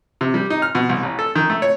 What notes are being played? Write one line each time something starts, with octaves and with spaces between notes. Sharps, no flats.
C3
G3
D#4
F6
B2
C2
A1
A4
D#3
A3
C#5